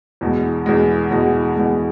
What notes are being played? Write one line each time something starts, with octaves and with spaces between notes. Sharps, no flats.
E2 B2 G#3
E2 B2 G#3
E2 B2 G#3
E2 B2 G#3